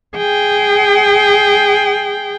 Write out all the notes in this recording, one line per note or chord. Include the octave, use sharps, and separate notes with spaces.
G#4 G5